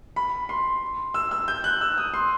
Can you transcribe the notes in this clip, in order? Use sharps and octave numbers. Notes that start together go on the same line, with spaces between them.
B5
C6
E6
E6
G6
F#6
E6
D#6
C6